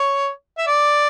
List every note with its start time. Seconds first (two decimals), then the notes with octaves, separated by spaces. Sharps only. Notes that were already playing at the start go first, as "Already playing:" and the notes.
Already playing: C#5
0.58 E5
0.67 D5